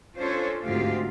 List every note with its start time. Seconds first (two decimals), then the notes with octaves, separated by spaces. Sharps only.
0.17 C#4 D4 F4 A4 C5 C#5
0.64 D2 G#2 C4 F4 G4 F5